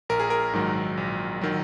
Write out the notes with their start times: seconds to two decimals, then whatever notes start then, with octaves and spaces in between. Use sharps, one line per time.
0.09 A#1 A#4
0.19 G#4
0.30 A#4
0.53 G#2 D#3 F#3
0.97 A#1
1.41 D#3 F#3